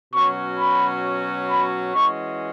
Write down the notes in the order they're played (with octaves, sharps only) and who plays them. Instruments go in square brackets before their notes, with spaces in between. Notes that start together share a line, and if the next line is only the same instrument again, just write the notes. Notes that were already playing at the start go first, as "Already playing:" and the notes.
[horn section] B2 F#3 C#4 F#4 [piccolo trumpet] C#6
[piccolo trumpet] B5
B5
[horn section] E3 G#3 C#4 F#4 [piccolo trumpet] C#6